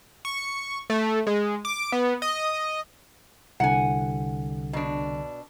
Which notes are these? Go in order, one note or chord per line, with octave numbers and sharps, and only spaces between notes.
C#6
A3
G#3
D6
B3
D#5
C2 D3 F#5 G#5
B2 D4